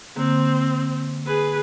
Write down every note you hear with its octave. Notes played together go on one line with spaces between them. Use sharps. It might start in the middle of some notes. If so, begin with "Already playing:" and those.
D3 A#3 C4
G#4 B4